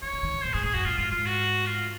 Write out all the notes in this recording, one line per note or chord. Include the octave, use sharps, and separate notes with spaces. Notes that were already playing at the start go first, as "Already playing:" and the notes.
D#3 C#5
C#3
D#3
C#3
A#2 C5
G#2 G#4
A#2 G#4
F#2 F#4
A#2 F4
G#2 F4
G#2 F4
F#4
F4